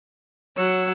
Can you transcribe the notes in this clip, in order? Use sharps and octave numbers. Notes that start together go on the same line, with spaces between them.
F#3 C#5 F#5 E6